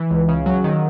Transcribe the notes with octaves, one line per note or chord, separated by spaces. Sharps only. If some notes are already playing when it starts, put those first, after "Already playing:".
Already playing: E3
C#2
C#3
F#3
D#3